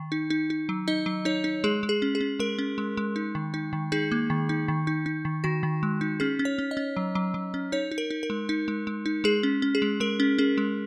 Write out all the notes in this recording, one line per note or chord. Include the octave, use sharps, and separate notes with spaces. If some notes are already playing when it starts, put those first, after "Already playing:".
Already playing: D#3
D#4
D#4
D#4
F#3
D#4 D#5
F#3
D#4 C#5
D#4
G#3 G#4
G#3
G#4
C#4
G#4
C#4
G#3 A#4
C#4
G#3
G#3
D#4
D#3
D#4
D#3
D#4 G#4
A#3
D#3
D#4
D#3
D#4
D#4
D#3
D#3 F#4
D#3
G#3
D#4
C#4 G#4
C#4
C#5
C#4
D#5
C#4
F#3
F#3
F#3
C#4
D#4 C#5
D#4
A#4
D#4
A#4
G#3
D#4
G#3
G#3
D#4
G#3 G#4
C#4
C#4
G#4
G#3
G#3 A#4
C#4
C#4 G#4
G#3